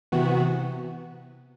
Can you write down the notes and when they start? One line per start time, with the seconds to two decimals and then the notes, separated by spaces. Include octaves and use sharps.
0.12 C3 E3 B3 F#4